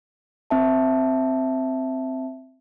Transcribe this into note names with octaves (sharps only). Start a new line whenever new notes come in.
C4 E5 A5